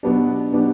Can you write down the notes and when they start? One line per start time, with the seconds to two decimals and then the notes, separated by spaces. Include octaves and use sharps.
0.03 B2 F#3 B3 D4 G4
0.53 B2 F#3 B3 D4 G4